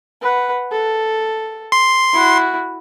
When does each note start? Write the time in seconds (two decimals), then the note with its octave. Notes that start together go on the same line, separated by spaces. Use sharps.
0.22 B4 F#5
0.71 A4
1.72 C6
2.13 E4 F#4